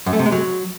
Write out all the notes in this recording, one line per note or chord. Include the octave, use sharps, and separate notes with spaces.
F#2
A3
C3
G#3
F#3